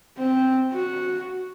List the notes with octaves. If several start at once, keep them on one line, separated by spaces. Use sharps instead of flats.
C4
F#4